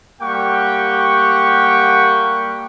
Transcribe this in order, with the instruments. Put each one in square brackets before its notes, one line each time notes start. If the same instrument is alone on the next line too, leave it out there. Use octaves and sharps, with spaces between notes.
[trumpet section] G3 A#3 G4 F#5 G5 C#6